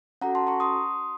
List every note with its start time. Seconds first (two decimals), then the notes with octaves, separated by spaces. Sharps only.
0.21 C#4 F#4 A4 F#5 A#5
0.35 A5 C6
0.47 A#5 C#6
0.60 C6 D#6